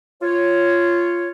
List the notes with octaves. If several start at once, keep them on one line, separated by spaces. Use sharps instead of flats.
F4 C#5